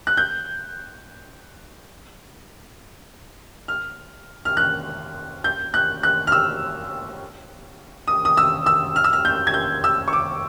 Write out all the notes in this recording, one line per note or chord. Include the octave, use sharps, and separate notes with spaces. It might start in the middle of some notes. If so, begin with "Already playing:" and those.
F#6
G6
F6
F6
F#6
G6
F#6
F#6
F6
E6
D#6
D#6
E6
E6
F6
E6
F6
G6
G#6
G6
E6
C#6
D6